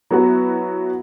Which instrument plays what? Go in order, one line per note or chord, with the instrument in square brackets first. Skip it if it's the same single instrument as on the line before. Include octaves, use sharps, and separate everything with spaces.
[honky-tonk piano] F#3 B3 E4 F#4